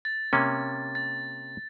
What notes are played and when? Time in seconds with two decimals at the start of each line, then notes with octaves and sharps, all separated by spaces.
0.05 A6
0.33 C3 A#3 C#4
0.95 A6